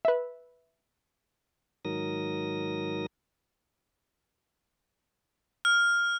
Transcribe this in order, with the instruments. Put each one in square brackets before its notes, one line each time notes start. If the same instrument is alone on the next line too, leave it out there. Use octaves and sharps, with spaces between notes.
[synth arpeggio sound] B4 E5
[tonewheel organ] G#2 D#3 F#3 A#4 D#6 A#6
[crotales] F6